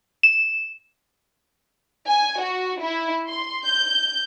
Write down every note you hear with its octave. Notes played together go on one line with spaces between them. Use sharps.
E7
G#5
F#4
E4
C6
G6